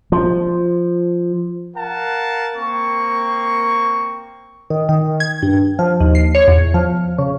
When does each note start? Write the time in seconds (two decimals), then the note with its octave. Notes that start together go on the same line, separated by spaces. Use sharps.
0.12 F3
1.76 A#4 F5 F#5 A5
2.55 A#3 C4 C#6
4.70 D#3
4.89 D#3
5.20 G#6
5.42 G2
5.79 F3
6.01 D#2
6.15 C7
6.35 C#5
6.48 E2
6.74 F3
7.18 C#3